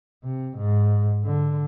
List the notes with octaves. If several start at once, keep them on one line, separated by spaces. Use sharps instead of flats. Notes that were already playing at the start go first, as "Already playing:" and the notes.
C3
G#2
D3